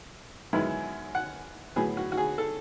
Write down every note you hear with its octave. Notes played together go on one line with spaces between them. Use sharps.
F#2 D#3 G#3 B3 E4
F#5
A2 F#3 B3 G#4
F#4
F#4
G#4
A4